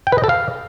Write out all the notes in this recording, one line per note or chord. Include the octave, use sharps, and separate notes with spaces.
G5
B4
D#5
A4
F5